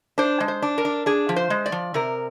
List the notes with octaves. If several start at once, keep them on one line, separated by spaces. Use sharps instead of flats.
D4 C5
G#3
C5
D4
A#4
D4
D4 G#4
F3
C5
G#3
D5
F3
C3 A#4